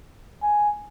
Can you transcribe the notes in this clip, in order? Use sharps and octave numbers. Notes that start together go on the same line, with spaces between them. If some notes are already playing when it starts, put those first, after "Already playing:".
G#5